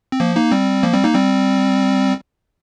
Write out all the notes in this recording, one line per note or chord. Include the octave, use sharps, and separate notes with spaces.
C4
F3 A#3
A#3 D#4
G3 C4
F3 A#3
G3 C4
A#3 D#4
G3 C4